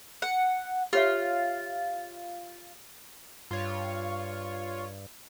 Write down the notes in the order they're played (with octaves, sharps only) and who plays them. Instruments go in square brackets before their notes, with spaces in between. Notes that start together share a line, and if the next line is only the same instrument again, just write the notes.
[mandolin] F#5
[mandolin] F4 [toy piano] G4 C#5 E5
[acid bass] G2 [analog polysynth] F4 C#5